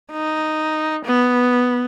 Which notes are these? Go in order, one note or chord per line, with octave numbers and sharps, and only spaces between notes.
D#4
B3